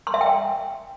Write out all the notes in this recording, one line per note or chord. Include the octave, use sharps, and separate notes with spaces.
C6
E5
G5